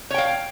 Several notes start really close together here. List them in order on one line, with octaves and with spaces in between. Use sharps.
C#5 G5 F5